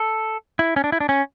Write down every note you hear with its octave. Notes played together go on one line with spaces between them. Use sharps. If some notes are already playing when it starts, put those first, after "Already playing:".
Already playing: A4
E4
C#4
D4
E4
D4
C#4